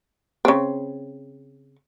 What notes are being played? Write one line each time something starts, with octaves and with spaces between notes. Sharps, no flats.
C#3 C4